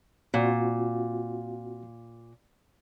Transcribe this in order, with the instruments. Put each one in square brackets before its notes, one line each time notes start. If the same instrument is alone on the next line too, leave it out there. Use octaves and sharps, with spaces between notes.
[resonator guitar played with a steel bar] A#2 [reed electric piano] C4 F4 F#4